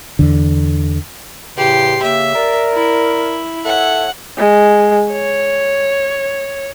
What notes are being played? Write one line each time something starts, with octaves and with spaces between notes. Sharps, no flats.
E2 D3
E2 A2 C#3 G4 C6
C#3 A#3 E5
A#4 D5
E4
A4 C#5 E5 F#5
G#3
C#5